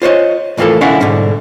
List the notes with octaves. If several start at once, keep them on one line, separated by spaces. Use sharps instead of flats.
F4 C5 C#5 D#5
F2 A2 E3 F3 A#3 A4
B1 D3 C#4 E4 F5 F#5
G#2 B2 D3 G3